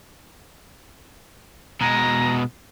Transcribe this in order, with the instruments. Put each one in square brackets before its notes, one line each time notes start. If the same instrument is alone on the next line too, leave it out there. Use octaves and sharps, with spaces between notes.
[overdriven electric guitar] B2 G#3 [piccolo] A#5